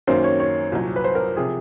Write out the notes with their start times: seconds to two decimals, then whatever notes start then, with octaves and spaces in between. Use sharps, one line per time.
0.07 F#2 D#3 F#3 A#3 C#4 C5
0.24 C#5
0.40 C#5
0.72 C2 A#2 F#3
0.96 B4
1.04 C5
1.15 A#4
1.36 C3 F3 G#4